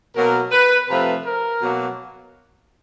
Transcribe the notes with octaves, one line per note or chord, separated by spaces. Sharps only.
B2 F#3 A#3 A#4
B4
C3 F3 A3 B4
A#4
B2 F#3 A#3